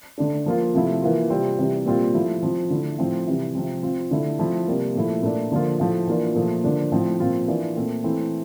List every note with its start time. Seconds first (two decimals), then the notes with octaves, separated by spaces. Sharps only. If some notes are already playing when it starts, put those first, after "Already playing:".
0.18 D3 A3 D4
0.46 F3 A#3 F4
0.74 C3 F3 A3 E4
1.02 E3 A#3 F4
1.30 C3 G3 C4 F4
1.58 C3 E3 G3
1.86 A#2 G3 C4 F4
2.14 F3 A3 E4
2.42 F3 C4 F4
2.70 D3 A3 E4
2.99 A2 F3 C4
3.27 C3 E3 G3
3.55 C3 F3 C4
3.83 F3 C4 F4
4.11 D3 A3 E4
4.39 F3 A3 C4 E4
4.68 C3 G3 A#3
4.95 A#2 F3 A3 E4
5.23 A#2 A3 D4
5.52 D3 F3 A#3 F4
5.80 A2 F3 A3
6.07 E3 A#3 D4 F4
6.35 A#2 F3 A3
6.64 D3 F3 A#3 D4
6.92 A2 F3 C4
7.20 A#2 F3 C4 F4
7.48 E3 A#3 D4 F4
7.76 A#2 A3 C4
8.04 E3 A3 C4 E4